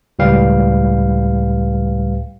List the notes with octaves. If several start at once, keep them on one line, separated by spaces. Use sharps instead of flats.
C#2 A2 G3 B4 F5 G5